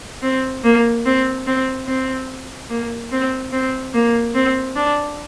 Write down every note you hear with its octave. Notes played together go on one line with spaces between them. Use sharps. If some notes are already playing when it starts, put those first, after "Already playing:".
C4
A#3
C4
C4
C4
A#3
C4
C4
A#3
C4
D4